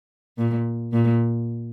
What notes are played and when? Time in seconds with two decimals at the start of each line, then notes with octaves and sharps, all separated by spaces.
0.37 A#2
0.93 A#2